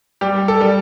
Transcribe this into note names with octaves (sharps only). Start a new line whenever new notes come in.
G3 G4
A4
G3